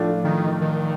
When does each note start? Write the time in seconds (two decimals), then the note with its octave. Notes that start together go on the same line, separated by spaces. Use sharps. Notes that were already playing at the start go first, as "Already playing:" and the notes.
Already playing: A2 F3 A3 D4 F4
0.24 D#3
0.61 D#3